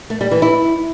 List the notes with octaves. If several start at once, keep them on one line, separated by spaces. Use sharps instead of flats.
A3
G3
E3
E4